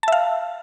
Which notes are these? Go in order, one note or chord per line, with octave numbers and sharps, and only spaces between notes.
E5 F5 A5